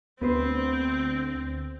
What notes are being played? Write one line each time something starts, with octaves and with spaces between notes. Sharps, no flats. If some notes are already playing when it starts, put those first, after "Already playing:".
D2 B3 C4 B4 C5